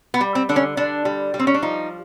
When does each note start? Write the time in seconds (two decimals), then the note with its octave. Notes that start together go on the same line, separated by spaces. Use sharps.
0.14 B3
0.21 G3
0.35 C4
0.49 D3 D4
0.56 C#4
0.77 D3 D4
1.05 G3
1.34 G3
1.39 C4
1.47 C#4
1.54 D4
1.62 F3 D#4